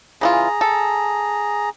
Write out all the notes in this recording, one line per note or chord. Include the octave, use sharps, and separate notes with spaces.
C#3 E3 F4 G#4 A#5
A4